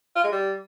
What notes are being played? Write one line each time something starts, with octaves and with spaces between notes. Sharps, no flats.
F4
G#3
G3